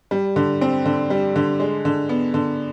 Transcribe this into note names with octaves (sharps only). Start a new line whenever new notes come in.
G3
D3
C4
D3
G3
D3
G#3
D3
B3
D3